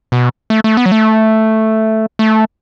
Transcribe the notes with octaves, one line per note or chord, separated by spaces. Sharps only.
B2
A3
A3
B3
F#3
A3
A3